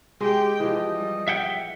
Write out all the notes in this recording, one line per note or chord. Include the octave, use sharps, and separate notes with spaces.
G#3 G4 G5
E3 F3 G4 D#5
G3
E5 F#5 G5